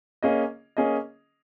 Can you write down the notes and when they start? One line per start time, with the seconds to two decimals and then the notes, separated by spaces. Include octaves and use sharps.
0.23 A#3 C#4 G#4 D#5
0.77 A#3 C#4 G#4 D#5